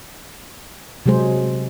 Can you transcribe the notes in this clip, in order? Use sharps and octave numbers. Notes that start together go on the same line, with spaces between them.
C3 F#3 G#3 G#4 C5